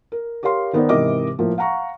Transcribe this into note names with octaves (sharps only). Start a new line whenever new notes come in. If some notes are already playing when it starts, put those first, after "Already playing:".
A#4
G4 A#4 C#5 F5 C6
D#3 B3 D#4 A#4 C5 D5
G#2 C3 E3 A#4 D#5 D6
A2 F3 A#3
F5 F#5 A#5 C#6